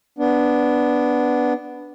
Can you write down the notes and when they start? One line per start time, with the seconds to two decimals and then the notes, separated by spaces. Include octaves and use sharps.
0.19 B3 D4